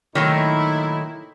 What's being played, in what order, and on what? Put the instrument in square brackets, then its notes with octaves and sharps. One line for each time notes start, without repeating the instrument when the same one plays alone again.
[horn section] A#2 D#4 E4 [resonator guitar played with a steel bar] D#3 F#3 A3